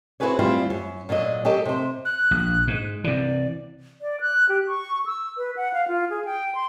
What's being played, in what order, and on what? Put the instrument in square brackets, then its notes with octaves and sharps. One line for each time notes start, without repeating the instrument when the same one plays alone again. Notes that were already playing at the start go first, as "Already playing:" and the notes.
[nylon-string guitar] C4 E4 F#4 G#4 B4 C#5
D2 G3 C4 E4 F4
F#2
A#2 D3 F#3 D#5
F#3 G4 A4 A#4 D#5
C3 C5
[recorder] F#6
[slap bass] A#1
G#2
[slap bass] C3 E3 [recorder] D5
[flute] D5
F#6
G4
C#6
E6
B4
F#5
F5
F4
G#4
G5
C6